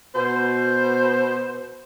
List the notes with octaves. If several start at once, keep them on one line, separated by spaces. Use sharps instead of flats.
B2 C5